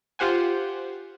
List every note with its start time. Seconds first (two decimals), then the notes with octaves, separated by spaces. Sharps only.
0.19 F4 G4 C5 F#5 G#5